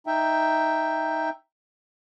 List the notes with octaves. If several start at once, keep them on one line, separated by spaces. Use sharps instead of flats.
D#4 E5 G5